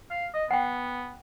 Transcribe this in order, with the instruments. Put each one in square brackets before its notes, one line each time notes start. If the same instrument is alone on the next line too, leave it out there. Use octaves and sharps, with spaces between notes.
[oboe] F5
D#5
[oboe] B3 [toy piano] F#5 G5